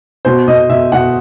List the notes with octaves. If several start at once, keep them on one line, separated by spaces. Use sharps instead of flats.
B2 C5
B2 D#5
B2 E5
B2 F#5